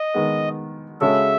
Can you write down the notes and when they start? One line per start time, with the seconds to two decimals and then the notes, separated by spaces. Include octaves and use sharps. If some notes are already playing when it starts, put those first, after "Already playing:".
Already playing: D#5
0.14 D#3 G#3 B3
1.01 C#3 G#3 C#4 F#4 A4 E5